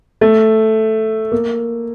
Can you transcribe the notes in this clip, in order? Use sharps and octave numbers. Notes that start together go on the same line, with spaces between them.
A3
A#3